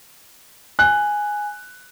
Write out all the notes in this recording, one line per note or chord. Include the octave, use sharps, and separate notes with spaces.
G#5 F#6